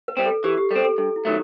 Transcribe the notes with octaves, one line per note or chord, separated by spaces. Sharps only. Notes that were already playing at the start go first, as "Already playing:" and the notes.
B4
G3 C4
A4
E3 G4
G4
G3 C4 A4
A4
G2 A4
E4
D#3 F#3 A3